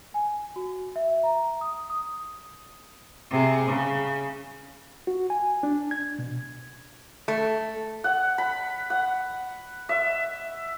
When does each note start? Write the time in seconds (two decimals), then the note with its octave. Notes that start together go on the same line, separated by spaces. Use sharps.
0.14 G#5
0.56 F#4
0.96 E5
1.23 A#5
1.61 D#6
1.90 D#6
3.31 C3 G#4
3.69 C#3
5.07 F#4
5.30 G#5
5.63 D4
5.91 G#6
6.19 B2
7.28 A3
8.04 F#5
8.38 B5
8.90 F#5
9.89 E5